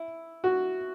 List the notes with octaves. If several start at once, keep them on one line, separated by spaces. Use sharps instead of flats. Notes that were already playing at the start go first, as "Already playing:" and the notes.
Already playing: E4
F#4